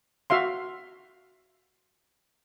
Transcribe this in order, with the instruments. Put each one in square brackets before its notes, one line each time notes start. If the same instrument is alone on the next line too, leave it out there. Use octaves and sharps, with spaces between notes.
[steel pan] F#4 E5 F5 C6